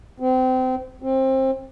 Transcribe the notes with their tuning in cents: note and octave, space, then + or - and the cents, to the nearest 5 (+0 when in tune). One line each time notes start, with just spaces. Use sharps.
C4 -30
C4 +20